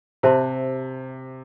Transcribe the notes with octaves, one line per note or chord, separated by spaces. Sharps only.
C3 G4 C5 E5 A5 C6